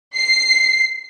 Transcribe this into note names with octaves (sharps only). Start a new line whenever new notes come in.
C7